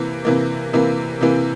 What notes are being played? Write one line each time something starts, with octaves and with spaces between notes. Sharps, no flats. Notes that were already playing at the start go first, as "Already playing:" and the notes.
Already playing: C3 E3 A#3
C3 E3 A#3
C3 E3 A#3
C3 E3 A#3